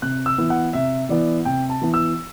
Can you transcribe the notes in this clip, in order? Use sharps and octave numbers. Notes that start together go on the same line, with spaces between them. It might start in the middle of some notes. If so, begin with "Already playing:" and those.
C3 F#6
E6
E3 B3 E4
F#5
C3 E5
E3 B3 E4 D5
C3 G5
A5
E3 B3 E4
E6